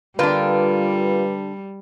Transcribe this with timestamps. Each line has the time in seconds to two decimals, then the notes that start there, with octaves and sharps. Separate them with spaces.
0.19 D3 G3 A#3 D4 F4 B4 G5